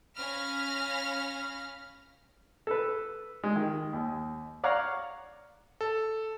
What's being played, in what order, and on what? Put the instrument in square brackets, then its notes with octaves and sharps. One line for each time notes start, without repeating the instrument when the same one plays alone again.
[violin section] C#4 F5 B5 F6 A#6
[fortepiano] A4 B4
G#3
D#3
D#2
C#5 D5 F5 F#5 A#5
[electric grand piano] A4